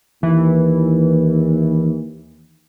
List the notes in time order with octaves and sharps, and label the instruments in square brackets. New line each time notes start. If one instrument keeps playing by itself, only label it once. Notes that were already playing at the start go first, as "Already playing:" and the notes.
[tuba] D#2 [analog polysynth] E3